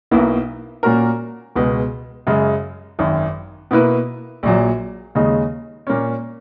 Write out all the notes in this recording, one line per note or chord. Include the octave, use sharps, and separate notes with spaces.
B1 B2 A#3 E4
A#2 A#3 C#4 F#4 A#4
C#2 B2 G#3
F#2 C#3 G#3
G#1 F#2 D#3
B2 A#3 E4 B4
A#1 A#2 F#3
D#2 C#3 G#3 D#4
A#2 A#3 C#4